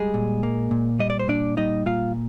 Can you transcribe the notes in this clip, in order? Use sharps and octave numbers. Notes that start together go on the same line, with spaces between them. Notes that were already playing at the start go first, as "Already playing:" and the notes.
Already playing: G3 G#3 G#4
A#2
A#3
A#2
G3 D#5
D5
C5
A#2 D4 D5
G3 D#4 D#5
A#2 F4 F5